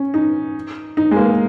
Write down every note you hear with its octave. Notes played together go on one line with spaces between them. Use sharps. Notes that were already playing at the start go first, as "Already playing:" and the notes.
Already playing: C#4
D#4
D#4
G#3
A#3